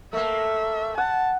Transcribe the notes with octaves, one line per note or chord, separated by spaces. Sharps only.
A3 A#3 E5
F#5 A5